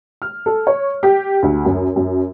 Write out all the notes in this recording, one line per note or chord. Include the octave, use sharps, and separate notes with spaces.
F6
A4
C#5
G4
D2
F#2
F#2